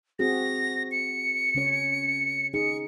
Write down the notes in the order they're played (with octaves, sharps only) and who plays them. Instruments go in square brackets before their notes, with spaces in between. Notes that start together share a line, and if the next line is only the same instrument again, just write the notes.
[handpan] C4 F#4 G#4 [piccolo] A#6
[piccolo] C#7
[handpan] C#3 C#4 C#5
[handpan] D#4 G#4 [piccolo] C#7